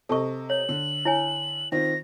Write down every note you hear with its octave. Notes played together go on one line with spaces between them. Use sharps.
C3 A4 D#5 A5 C#6
C#5 F#7
D3
E4 C#5 G#5
D#3 C4 F4 A#6